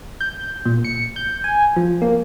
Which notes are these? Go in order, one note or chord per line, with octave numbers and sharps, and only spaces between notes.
G6
A#2
C#7
G6
G#5
F3
A#3